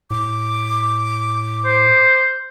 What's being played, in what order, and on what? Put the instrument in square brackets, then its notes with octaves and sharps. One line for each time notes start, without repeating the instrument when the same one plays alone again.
[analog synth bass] A2 [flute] D6
[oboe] C5